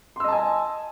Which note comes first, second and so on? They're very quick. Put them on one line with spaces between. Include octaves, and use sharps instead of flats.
C6 E6 D#5 A5 G#5